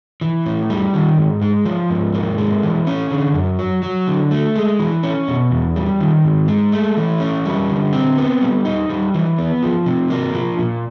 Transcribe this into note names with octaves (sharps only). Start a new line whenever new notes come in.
E3
A2
G3
D#3
G#2
G#3
F3
G#2
A#3
G#3
E3
C#4
D3
F#2
F#3
F#3
D3
A3
G#3
E3
C#4
B2
E2
G3
D#3
G#2
G#3
A3
E3
C#4
G3
D3
C4
B3
G3
D#4
G3
E3
B3
F3
C3
A#3
F3
A#2